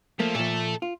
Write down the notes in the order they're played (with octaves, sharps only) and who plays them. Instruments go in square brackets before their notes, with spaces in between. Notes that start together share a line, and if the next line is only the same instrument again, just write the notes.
[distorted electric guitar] F3 [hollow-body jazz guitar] A3 A#3
[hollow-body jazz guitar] A#2 F3 [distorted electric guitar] A4 E5
[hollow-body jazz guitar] F4